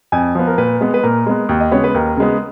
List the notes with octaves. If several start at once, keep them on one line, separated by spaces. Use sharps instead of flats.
F2 G#5
F3 B3
A#4
A#2 B4
G#3 B3
B4
A#2 A#4
G#3 B3
D#2
D#5
C#3 G#3 B3 C#5
B4
D#2 A#4
C#3 G#3 B3